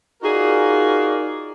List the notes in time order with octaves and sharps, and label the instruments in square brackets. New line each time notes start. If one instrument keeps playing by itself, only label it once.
[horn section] D#4 F4 F#4 G#4 A#4 D5